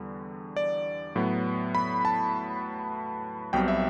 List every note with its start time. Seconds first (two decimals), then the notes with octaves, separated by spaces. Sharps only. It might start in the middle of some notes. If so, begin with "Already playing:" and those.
Already playing: E2 D3 G3
0.56 D5
1.16 A2 F#3 B3
1.75 B5
2.05 A5
3.53 B1 B2 G3 C4 G5
3.68 E5